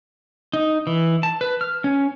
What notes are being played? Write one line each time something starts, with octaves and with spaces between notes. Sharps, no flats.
D#4
E3
A5
B4
F6
C#4